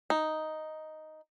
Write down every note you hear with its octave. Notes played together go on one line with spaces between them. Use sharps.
D#4